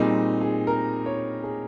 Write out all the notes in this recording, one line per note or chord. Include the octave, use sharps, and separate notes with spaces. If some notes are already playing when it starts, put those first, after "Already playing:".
Already playing: A#2 G3 C4 D#4 G#4
G#4
A#4
C#5
G#4